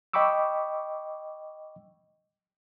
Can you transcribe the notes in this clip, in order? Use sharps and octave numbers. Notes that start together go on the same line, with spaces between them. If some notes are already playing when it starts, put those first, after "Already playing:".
D#5 G5 B5 C#6 D6 E6